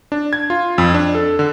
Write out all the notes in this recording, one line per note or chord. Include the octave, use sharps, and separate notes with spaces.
D4
G#6
F4
F2
D4
A4
D3